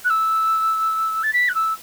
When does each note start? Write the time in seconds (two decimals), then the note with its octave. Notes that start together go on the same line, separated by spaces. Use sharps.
0.05 F#6
0.10 E6
1.23 A6
1.33 B6
1.49 F#6
1.55 E6